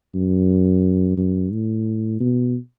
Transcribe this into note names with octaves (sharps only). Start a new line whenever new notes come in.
F#2
F#2
A2
B2